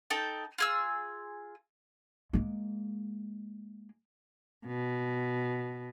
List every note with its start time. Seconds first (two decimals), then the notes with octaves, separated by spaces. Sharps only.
0.10 D#4 A4 G5 A5
0.58 F4 G#4 E6
2.33 G#3 A#3
4.67 B2